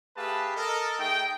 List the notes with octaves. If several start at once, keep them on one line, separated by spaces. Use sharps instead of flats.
A3 G4 G#4 B4 F5 A5
A4 A#4 D#5
A3 D#4 G#4 G5